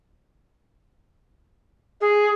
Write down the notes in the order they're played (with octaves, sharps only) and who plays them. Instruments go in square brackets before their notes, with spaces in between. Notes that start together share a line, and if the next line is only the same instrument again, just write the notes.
[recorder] G#4